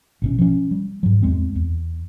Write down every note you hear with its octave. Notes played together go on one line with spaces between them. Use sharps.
A1 B2 C#4
F3 C#4
G3
G#2 F#3
E2 G#3 C4
E2